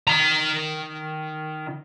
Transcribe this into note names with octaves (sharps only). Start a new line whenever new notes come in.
D#3 A#5